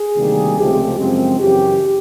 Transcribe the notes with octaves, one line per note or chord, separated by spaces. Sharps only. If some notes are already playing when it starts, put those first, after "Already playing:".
Already playing: G#4
D2 C3 D#3 G3 A#3
C#2 C3 F3 A3 C4 G4
F#2 C#3 F3 G#3 C4
F#2 C#3 E3 G4